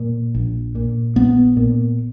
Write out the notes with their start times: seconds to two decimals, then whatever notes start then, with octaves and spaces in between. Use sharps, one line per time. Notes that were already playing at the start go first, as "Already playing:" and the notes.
Already playing: A#2
0.34 A#1
0.75 A#2
1.15 A#1 B3
1.57 A#2